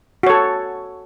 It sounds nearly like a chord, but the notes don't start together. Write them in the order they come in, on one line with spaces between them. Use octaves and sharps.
F#4 C#5 A4